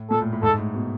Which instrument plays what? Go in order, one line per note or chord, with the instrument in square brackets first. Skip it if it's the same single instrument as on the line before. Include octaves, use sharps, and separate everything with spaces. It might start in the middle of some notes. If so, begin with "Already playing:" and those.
Already playing: [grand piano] A2
[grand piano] A#2 [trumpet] A4
[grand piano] A2
A2
[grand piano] G#2 [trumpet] A4
[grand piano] A2
B2